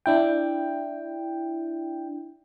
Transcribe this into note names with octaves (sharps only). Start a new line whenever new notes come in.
D4 E4 G5